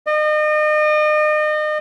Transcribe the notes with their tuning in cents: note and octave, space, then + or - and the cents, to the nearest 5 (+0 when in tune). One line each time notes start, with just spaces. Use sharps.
D#5 -40